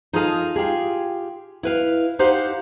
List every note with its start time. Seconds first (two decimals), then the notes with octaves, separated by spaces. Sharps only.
0.13 D#4 F4 G#4 A4 D#5 F5
0.56 F4 G4 G#4
1.63 E4 B4 F5
2.19 D#4 G4 C5 F5 F#5